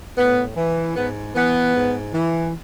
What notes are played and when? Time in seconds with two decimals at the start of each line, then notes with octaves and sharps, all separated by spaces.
0.18 A2 B3
0.57 E3
0.95 G#2 B3
1.35 E3 B3
1.75 G#2
2.13 E3